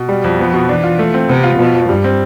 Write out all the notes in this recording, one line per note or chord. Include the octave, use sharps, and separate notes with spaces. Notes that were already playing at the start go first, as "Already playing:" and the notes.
Already playing: B2
G3
F2
F3 B3
B2
E3 D4
F4
A3
C4
C3 B3
F4
B2 F3
F2
G2 G3
C4